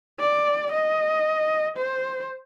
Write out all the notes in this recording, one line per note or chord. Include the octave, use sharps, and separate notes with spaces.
D5
D#5
C5